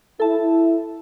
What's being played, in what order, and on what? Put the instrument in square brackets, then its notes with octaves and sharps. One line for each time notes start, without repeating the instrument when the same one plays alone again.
[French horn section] E4 [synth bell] A4 A5